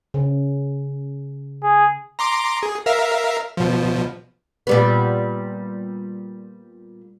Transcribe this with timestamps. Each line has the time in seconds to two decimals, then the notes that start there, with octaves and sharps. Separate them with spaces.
0.14 C#3
1.63 G#4
2.19 A#5 C6 D6
2.63 G#4
2.86 A#4 E5 F5
3.57 B2 F3
4.67 A#2 G3 B3